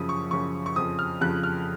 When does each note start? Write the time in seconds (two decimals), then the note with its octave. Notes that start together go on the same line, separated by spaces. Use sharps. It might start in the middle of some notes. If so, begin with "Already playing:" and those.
Already playing: F#2 C#3 F3 D#6
0.09 C#6
0.31 F#2 C#3 F3 C#6
0.66 C#6
0.76 F2 C#3 F3 D#6
0.99 F6
1.21 F2 C#3 F3 F#6
1.43 F6